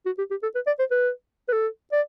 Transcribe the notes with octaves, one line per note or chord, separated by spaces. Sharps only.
F#4
G4
G4
A4
B4
D5
C5
B4
B4
A4
D5